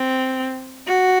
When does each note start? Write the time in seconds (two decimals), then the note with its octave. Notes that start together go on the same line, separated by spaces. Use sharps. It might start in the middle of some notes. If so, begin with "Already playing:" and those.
Already playing: C4
0.87 F#4